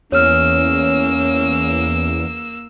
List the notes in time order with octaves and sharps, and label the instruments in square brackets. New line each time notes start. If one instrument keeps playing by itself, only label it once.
[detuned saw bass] E2 [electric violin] A#3 E6 [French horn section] C#4 [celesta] C#5 F6